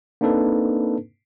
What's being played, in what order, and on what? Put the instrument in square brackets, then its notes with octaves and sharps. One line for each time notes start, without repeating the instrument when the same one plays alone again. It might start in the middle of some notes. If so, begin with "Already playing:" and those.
[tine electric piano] A#3 C4 D4 D#4 A4 B4